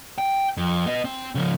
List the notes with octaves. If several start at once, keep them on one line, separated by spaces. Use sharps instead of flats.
G5
F2
B3 D#5
C4
C#3 F3